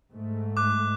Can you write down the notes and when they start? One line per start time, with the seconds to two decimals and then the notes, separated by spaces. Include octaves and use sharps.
0.12 G#2 A3
0.57 D6 F#6